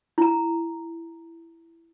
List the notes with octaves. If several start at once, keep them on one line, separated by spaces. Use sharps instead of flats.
E4 A#5